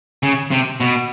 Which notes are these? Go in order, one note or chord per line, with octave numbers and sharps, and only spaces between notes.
C#3
C3
B2